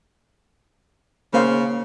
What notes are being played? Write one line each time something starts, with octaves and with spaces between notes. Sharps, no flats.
C#3 A#3 C5 F5